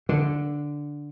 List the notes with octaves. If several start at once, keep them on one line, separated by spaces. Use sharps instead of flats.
D3